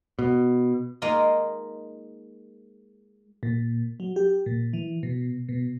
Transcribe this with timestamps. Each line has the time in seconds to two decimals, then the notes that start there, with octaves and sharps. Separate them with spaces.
0.19 B2
1.02 G#3 A#3 D#4 F4 G#4 D#5
3.43 A#2
4.00 F#3
4.16 G4
4.46 A#2
4.73 E3
5.03 B2
5.49 B2